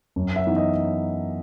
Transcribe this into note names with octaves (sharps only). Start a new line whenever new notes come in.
F#2
E5
E3 B3 D#4
D#5